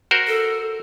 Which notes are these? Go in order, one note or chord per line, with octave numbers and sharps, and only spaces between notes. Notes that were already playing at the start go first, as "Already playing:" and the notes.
F#4 A#4 C5
A4